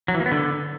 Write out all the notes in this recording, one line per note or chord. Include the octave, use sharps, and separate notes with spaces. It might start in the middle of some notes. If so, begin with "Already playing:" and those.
F#3
E3
A#3
B3
D3